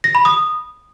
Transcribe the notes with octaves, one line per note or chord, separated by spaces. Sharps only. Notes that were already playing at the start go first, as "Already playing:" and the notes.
A#6
B5
D#6